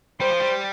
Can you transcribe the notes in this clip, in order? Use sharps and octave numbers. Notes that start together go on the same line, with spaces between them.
G3 C5
F3
G3